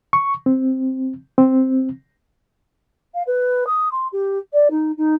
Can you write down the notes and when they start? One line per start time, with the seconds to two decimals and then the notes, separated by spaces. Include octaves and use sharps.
0.13 C#6
0.46 C4
1.38 C4
3.14 F5
3.27 B4
3.66 D#6
3.92 C6
4.12 G4
4.53 D5
4.70 D#4
4.97 D#4